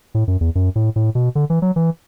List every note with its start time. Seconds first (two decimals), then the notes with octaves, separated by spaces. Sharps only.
0.14 A2
0.28 F#2
0.41 E2
0.55 F#2
0.75 A2
0.96 A2
1.15 B2
1.35 D3
1.50 E3
1.62 F#3
1.76 E3